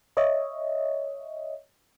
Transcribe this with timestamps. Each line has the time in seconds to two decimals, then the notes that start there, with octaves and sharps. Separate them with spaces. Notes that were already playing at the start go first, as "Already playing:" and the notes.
0.17 C#5 D#5 E5